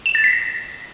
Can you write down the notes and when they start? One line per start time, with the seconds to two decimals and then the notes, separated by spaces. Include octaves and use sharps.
0.06 E7
0.15 A6
0.24 B6
0.33 A#6